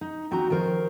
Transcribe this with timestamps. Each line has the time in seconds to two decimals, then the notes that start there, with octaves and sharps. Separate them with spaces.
0.01 D#4
0.31 D#2 C4 D#4 F#4 A#5
0.50 D#3 F3 A#4 C5